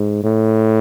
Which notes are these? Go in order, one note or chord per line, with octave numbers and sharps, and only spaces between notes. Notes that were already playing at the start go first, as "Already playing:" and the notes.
Already playing: G#2
A2